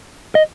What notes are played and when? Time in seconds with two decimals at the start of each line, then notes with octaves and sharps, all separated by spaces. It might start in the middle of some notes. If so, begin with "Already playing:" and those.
0.35 D#5